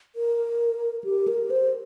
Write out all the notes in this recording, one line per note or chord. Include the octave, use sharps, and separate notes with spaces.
A#4
G4
A#4
C5